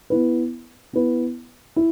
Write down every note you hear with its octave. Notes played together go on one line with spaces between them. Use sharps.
B3 E4 B4
B3 E4 B4
E4